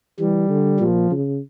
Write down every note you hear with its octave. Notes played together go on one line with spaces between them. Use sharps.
E3 G3
D3
A#2 F3
C#3